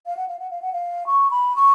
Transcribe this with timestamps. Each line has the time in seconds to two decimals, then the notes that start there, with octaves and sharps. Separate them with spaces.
0.06 F5
0.17 F#5
0.28 F5
0.39 F#5
0.50 F5
0.62 F#5
0.73 F5
1.06 C#6
1.31 B5
1.56 C#6